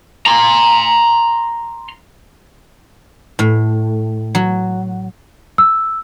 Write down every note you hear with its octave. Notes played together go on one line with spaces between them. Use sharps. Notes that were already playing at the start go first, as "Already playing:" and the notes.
A#5 C6
A2
F#3
E6